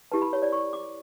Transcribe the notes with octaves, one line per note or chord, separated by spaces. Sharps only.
E4 G4 B4 A5
B5
C#5
D5
C#6
D6